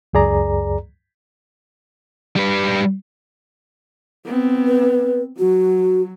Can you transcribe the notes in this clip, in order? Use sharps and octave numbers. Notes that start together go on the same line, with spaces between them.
C#2 F#2 G#4 D5 A#5
G3 B4
B3 C4
B4
F#3 F#4